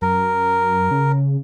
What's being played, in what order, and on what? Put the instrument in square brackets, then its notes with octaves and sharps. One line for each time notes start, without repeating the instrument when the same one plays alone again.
[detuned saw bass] F#2 [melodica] A#4
[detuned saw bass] C#3